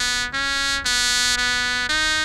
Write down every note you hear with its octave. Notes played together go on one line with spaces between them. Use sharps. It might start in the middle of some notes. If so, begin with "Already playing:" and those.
Already playing: B3
C#4
B3
B3
D#4